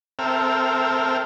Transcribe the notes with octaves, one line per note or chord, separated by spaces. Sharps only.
C4 A4 A#4 E5 G5 F6